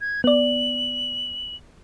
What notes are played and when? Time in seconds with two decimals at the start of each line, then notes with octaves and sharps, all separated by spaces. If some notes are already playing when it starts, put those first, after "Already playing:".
0.01 G#6
0.24 B3 D5 F#7